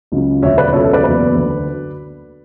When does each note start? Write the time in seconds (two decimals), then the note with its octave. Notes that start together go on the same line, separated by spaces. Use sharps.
0.12 C#2 C#3 F#3
0.43 E1 D2 D3 F#3 C#5 E5
0.58 B4 D5
0.73 C#2 B2 F#3 A4 C#5
0.83 A4 C#5
0.93 B4 D5
1.04 F#1 E2 B2 F#3 B4 D5
1.35 D2 D3 F#3